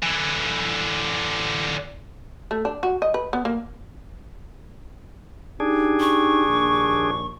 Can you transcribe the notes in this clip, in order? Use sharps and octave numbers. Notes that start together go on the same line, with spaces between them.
D3 E3
A3
D4
F#4
D#5
B4
B3
A#3
D4 D#4 G4 G#4
C#6
A#1 D#2